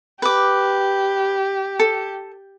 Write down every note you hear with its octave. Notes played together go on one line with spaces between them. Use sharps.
G4 B4 D6
A4